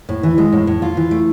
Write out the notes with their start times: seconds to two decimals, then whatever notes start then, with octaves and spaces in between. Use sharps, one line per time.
0.09 A2
0.23 E3
0.38 G#3
0.52 A2
0.67 A2
0.82 F4
0.97 E3
1.11 A3